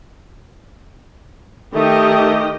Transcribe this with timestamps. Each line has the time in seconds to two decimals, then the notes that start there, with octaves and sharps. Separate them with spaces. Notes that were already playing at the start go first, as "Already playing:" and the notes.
1.75 D#3 A3 G4 D#5